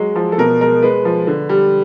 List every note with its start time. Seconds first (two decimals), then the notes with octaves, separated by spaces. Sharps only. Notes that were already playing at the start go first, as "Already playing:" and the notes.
Already playing: F#3 G#3
0.16 F3
0.32 A4
0.38 B2 A#4
0.61 G#3 A#4
0.82 G#3 B4
1.05 F3
1.27 D3
1.49 G3